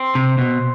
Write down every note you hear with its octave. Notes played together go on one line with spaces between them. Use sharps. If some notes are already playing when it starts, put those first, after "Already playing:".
Already playing: C4
C3
B2